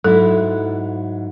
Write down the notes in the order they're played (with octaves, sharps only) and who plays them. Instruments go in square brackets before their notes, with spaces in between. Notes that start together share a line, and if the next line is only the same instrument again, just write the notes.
[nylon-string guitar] G#2 F#3 E4 [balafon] A4